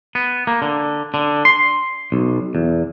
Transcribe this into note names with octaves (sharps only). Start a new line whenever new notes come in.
B3
A#3
D3
D3
C6
B1
E2